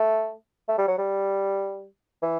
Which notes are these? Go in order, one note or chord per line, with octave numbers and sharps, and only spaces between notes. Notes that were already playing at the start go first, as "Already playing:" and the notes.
Already playing: A3
A3
G3
F#3
G3
E3